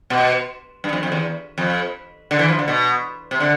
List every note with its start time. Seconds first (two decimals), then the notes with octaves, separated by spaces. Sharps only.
0.10 B2
0.84 G2
0.93 F2
1.03 F2
1.12 E2
1.58 F2
2.31 D3
2.39 E3
2.48 F3
2.59 D3
2.68 B2
3.31 C3
3.40 D3